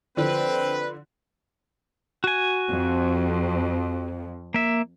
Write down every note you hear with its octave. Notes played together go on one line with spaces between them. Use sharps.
D3 F3 C4 B4
F#4 G#5
F2
A#3 E5